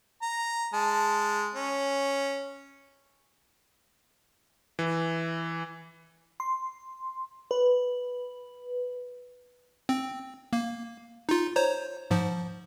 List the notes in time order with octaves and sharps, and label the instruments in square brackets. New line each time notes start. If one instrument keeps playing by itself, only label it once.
[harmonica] A#5
G#3 A5
C#4
[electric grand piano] E3
[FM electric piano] C6
B4
[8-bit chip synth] C4
A#3
D#4 F4
C5 C#5 A#5
G#2 F3